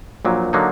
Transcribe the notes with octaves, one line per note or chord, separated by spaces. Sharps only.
A#1 A#2 F#3
D3 F#3 A#3 D#4